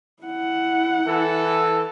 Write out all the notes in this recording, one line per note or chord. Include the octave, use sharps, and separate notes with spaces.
E4 F#5
E3 A4